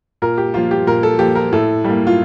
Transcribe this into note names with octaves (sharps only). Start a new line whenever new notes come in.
A#2 A#4
G4
F3 A#3 F4
G4
A#2 A#4
A4
F3 A#3 G4
A#4
A2 A4
G3 A#3
F4